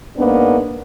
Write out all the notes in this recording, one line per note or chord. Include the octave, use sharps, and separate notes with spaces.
G#2 A#3 B3 D4